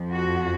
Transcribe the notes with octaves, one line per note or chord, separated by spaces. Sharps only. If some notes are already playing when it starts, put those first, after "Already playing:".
Already playing: F2 F3
F#4